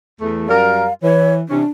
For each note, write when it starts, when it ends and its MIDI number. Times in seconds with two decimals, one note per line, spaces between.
0.21 0.45 40
0.21 0.45 57
0.48 0.87 42
0.48 0.87 55
0.48 0.87 70
0.48 0.93 77
1.02 1.42 52
1.02 1.36 73
1.49 1.63 48
1.49 1.63 52
1.49 1.63 61
1.49 1.67 62